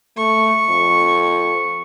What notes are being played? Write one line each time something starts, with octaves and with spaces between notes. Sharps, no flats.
A3 C#6
F2